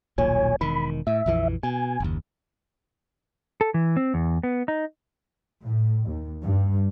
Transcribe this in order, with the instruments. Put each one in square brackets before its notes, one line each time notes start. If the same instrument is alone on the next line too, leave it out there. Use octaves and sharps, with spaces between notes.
[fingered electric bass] D#1 B1 A#2 [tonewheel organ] C#5 G#5
[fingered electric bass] E1 D#3 [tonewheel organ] B5
[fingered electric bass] A2 [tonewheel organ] E5
[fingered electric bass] A#1 F2 E3
[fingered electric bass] B2 [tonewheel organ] G#5
[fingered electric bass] F#1 D#2
[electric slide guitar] A4
E3
C4
E2
B3
D#4
[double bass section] A2
D#2
G2